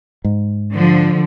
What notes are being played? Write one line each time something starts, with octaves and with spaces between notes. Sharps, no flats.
G#2
D3 F3